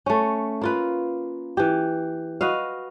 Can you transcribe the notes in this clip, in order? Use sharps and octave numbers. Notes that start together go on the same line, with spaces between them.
A3 C#4
A#3 F4 B4
E3 G4
F#4 B4 D#5 F5